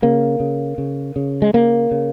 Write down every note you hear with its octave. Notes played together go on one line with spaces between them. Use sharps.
C#3 A#3
C#3
C#3
C#3
G#3
C#3 A#3
C#3